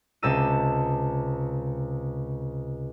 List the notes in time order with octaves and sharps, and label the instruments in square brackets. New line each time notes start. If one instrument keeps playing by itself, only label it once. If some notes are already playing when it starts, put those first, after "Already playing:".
[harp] C#2 C3 A5 A#5 E6 D#7